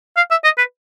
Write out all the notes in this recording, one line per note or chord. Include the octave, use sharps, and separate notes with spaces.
F5
E5
D#5
B4